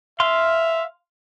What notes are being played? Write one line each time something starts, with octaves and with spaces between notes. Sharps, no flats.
E5 F5 C6